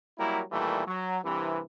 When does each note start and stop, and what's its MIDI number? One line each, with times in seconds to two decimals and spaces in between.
0.18 0.42 54
0.18 0.42 55
0.18 0.42 58
0.18 0.42 64
0.18 0.42 70
0.52 0.86 46
0.52 0.86 51
0.52 0.86 52
0.52 0.86 55
0.52 0.86 57
0.87 1.19 54
1.24 1.62 36
1.24 1.62 43
1.24 1.62 48
1.24 1.62 52